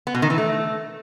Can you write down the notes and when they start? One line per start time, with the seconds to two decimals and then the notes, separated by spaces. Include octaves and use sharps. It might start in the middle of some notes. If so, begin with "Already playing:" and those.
0.07 B3
0.15 B2
0.22 D#3
0.30 E3
0.38 A3